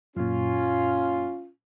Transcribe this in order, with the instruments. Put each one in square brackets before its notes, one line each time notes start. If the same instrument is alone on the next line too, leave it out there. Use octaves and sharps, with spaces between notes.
[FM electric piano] F#2 A#2 [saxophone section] C#4 F4